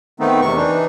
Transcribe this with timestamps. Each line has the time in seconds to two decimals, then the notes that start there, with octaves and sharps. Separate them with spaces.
0.20 D#3 A3 B3 C4 D#4
0.41 E2 C3 C#6
0.56 E3 D4 D#4